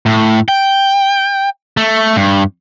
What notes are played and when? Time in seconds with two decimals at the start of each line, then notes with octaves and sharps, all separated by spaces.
0.06 A2
0.48 G5
1.77 A3
2.16 G2